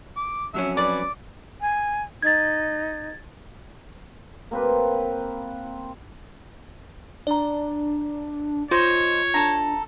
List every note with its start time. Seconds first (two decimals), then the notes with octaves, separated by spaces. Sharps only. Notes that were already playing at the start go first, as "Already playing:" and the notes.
0.17 D6
0.54 F2 F#3 C#4 E5
0.77 B4 D5 D6
1.61 G#5
2.23 D#4 G#6 A6
4.51 A#3 C4 B4
7.27 D4 D5 A#5
8.71 D#4 F4 C5 C#5
9.34 D4 A4 A#5